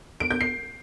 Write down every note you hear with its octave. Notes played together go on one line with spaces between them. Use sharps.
D7
G6
C7